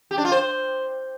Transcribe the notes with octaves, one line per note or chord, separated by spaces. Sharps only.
G4
D4
F4
C5